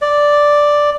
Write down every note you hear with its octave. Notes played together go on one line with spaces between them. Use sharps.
D5